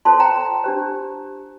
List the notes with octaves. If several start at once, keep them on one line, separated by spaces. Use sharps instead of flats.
F4 A4 C5 A5 C6
G5 A#5
D4 G4 C5